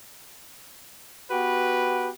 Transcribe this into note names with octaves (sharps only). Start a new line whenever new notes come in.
B3 F#4 G4 B4